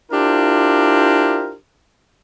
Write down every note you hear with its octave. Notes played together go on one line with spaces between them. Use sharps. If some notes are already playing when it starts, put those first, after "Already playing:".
D4 E4 F4 G4 A#4 C5